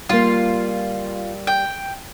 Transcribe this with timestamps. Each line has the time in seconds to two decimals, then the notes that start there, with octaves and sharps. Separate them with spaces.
0.09 G3 A#3 F4
1.47 G5